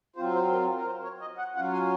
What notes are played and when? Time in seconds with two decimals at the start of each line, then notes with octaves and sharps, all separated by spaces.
0.16 F#3 C4 F4 C5
0.34 C5
0.52 A#4
0.75 A#4
0.86 C5
1.03 C#5
1.21 D#5
1.38 F#5
1.55 F#3 C#4 F4 F#5
1.73 G#5